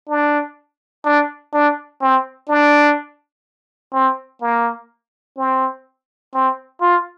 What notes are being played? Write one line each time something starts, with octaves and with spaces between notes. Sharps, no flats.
D4
D4
D4
C4
D4
C4
A#3
C4
C4
F4